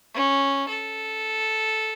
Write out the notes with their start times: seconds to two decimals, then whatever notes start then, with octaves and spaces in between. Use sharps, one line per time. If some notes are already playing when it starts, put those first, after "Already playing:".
0.14 C#4
0.68 A4